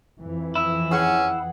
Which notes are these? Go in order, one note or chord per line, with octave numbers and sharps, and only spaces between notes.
F2 E3
E4
C#4 G#4 F#5 G5